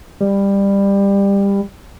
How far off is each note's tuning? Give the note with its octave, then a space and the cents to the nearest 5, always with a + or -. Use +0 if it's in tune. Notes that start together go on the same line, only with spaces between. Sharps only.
G3 +20